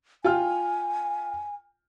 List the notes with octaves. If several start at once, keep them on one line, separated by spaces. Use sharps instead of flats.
F4 G5 G#5 F6